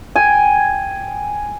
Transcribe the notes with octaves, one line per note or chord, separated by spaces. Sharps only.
G5 G#5